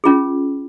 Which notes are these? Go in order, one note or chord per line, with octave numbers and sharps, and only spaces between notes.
C#4 F4 G#4